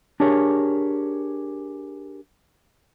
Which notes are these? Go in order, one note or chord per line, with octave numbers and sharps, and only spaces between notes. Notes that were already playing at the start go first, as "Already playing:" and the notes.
D4 G4 G#4 A#4 C#5